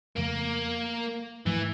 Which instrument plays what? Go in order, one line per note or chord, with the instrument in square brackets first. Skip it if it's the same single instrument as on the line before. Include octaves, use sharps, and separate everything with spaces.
[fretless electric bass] F2 C#3 F3 A3 [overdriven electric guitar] A#3
[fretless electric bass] G#2 F3 A3 [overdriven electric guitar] E3